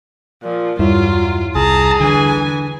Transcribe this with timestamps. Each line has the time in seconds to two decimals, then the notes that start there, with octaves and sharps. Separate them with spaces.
0.44 A#2 F3
0.79 E2 G2 F#3 G3 E4 F4
1.55 C2 G#4 A5 A#5
2.00 D3 E3 G#5